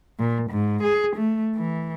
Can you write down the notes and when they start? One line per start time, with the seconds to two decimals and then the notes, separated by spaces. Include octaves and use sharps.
0.19 A#2
0.51 G#2
0.83 G#4
1.17 A3
1.56 E3